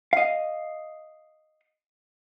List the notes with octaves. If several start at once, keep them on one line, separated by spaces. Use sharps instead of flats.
D#5 F5